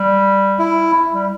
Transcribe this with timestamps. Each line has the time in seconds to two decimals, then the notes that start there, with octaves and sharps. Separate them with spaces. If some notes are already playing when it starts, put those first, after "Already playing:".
Already playing: G3
0.59 E4
1.13 G3